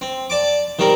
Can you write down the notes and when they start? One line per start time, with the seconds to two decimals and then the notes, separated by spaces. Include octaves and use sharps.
0.01 C4
0.30 D5 A5 D6
0.79 D#3 G3 C4 A#4